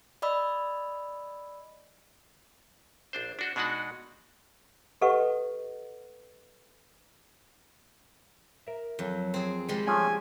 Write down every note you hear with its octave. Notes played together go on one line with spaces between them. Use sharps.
D5 D#5 B5 E6
A#1 D4 C5
D4 F#4 C5
B2 G#3 D4 D#4 F#4 F#5
G4 A4 B4 D#5 F#5 C#6
A#4 E5
F2 F#3
C4 G#4
G3 G#3 C4
F3 A3 C#4 G#5